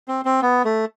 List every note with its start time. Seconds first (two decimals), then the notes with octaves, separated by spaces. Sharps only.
0.08 C4
0.25 C4
0.42 B3
0.65 A3